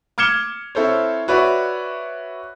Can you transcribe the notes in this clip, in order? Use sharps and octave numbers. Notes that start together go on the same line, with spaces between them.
D6 F6 G#6 C#7 E7 G7
C4 E4 A4 C5 C#5
F#4 B4 C#5 D5 E5